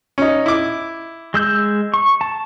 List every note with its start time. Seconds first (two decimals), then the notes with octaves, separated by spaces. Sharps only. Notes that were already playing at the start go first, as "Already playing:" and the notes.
0.18 C#4 D#4
0.46 E4 D6
1.34 G#3 E6 G6
1.94 C#6
2.21 A5